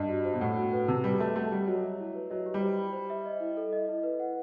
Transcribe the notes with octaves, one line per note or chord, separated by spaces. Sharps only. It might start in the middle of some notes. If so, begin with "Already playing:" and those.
Already playing: G2 G4 D#5
F#4
C5
B2
A2 F#5
F#4
B4
C3 A5
G3 B4
A3 E5
A3 F#5
G3 G4
F#3 D#5
E5
E4
B4
F#3 D#5
G4
G3
C5
B5
C5
E5
D#5
E4
A4
D#5
E4
B4
F#5